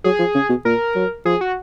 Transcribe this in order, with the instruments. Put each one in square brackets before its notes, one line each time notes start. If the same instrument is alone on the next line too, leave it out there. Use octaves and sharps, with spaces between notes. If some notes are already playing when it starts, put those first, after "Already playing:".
[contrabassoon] F#3 [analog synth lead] G#4
[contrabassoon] F3
C#3
B2
[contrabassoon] A#2 [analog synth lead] A#4
[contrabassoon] F#3
[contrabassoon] F3 [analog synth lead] G#4
[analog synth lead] F#4